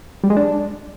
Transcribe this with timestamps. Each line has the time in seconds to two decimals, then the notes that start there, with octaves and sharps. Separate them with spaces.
0.24 G3
0.30 G#3
0.37 D4